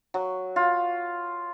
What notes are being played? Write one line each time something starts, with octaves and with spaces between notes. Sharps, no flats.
F#3
F4